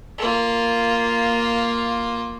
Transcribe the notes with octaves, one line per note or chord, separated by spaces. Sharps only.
A#3 F4